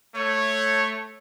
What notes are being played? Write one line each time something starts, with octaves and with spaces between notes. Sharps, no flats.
A3 C#5